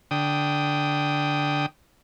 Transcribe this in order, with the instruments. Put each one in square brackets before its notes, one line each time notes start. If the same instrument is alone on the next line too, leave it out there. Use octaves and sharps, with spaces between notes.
[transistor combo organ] D3 G5 D#6